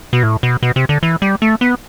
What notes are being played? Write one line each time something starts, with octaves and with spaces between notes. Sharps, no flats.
B2
A2
B2
B2
C3
D3
E3
G3
A3
B3